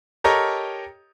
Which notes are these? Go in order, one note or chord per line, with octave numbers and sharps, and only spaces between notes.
G4 A4 A#4 C#5 D#5 A#5